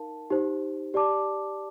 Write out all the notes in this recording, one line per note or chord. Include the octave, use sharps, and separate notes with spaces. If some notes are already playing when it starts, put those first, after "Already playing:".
Already playing: D#4 A#4 F5 A5
D#4 G4 C5
G4 D5 A5 D6